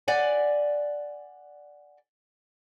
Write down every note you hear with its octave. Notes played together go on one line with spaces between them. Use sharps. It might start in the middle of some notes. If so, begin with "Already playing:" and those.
D5 F#5 G#5